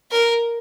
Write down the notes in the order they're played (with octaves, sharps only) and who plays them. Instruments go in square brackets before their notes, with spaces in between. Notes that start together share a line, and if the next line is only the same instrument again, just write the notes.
[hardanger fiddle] A#4